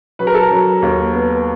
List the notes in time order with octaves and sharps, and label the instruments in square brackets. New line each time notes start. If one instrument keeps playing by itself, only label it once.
[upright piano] F#3 B4
A#4
A4
A#4
F#3
D#2
B3